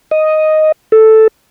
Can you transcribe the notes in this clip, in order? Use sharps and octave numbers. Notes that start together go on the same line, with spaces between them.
D#5
A4